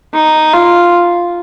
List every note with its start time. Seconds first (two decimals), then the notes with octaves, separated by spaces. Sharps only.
0.14 D#4
0.53 F4